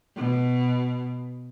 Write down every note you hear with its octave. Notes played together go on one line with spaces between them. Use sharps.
B2